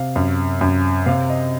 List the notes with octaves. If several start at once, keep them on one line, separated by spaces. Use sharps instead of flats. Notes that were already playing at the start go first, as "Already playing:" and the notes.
Already playing: C3 F5
F#2
F#2
C3 F5
D#5